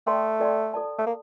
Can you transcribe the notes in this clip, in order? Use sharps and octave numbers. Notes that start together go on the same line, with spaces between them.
A3 A4 D5 G5 C6
A4 D5 G5 C6
A4 D5 A5
A3
A#3 A4